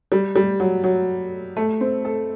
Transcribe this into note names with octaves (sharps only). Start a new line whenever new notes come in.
G3
G3
F#3
F#3
A3
C4
A4